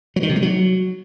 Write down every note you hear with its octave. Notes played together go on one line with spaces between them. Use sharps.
F#3
D#3
C3
G#3
F#3